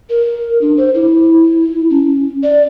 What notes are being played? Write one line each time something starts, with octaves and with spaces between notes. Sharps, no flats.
A#4
D4
C5
E4
C#4
D5